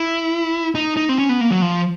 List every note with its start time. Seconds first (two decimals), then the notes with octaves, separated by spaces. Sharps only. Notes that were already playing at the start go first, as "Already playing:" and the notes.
Already playing: E4
0.75 D#4
0.97 D#4
1.09 C4
1.18 C#4
1.29 B3
1.41 A#3
1.51 F#3
1.62 F3